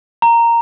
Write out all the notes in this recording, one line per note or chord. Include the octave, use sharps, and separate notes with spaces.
A#5